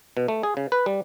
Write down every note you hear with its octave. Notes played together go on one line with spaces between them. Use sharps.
B2
A3
G#4
C#3
B4
G3